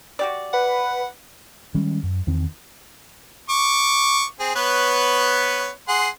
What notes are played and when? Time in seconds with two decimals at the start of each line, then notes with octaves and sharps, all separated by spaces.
0.19 F#4 G4 D5
0.53 B4 F#5
1.75 D#3 G3 G#3 C#4
2.03 F#2
2.27 E2 D#3 C4
3.49 C#6 D6
4.40 C4 G#4
4.56 B3 B4 C#5
5.88 G#4 F#5 C6